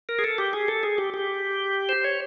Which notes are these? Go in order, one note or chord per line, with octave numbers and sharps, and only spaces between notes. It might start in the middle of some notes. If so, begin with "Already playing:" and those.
A#4
G#4
A4
G4
G#4
A4
G#4
G4
G4
C5
C#5